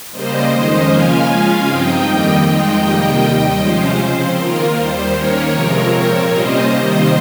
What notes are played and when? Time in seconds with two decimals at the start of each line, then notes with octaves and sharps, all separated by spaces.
0.12 C#3 G3 A#3 C5 D#5
0.50 F2 D#3 G#3 C#4
0.88 C#3 F3 A#3 C#4 F4 F5 G#5
1.27 C#3 G#3 C#4 F4
1.66 G2 F3 C4 D#4 D#5 G5
2.04 F2 D#3 G3 A#3
2.42 F2 D#3 G#3 C4 D#4 D#5 G5
2.81 F2 C3 D#3 G3 A#3
3.20 D#2 D#3 G3
3.58 C3 F3 G#3 C#4 F4 C5
3.97 C#3 F3 C4
4.35 D#3 A#3 F4 A#4
4.74 D#2 D#3 G3 C5
5.13 D#3 A#3 C#4 A#4 C#5
5.52 F2 C3 F3 G#3 C4
5.90 A#2 F3 C4
6.29 C3 G3 A#3 C#4 F4 C5 D#5
6.67 C3 D#3 G3 A#3